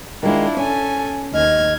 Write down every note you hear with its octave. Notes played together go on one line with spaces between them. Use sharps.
D#3 G#3 D4 E4 F4
C#4 A4 G#5
D#2 D#5 F6 G#6